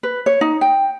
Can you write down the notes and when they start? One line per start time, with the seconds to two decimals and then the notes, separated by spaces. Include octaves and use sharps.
0.03 B4
0.26 C#5
0.41 D#4
0.61 G5